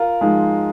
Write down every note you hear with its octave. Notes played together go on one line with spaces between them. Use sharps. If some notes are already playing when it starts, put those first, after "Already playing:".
Already playing: F4 A#4
G#2 F3 G#3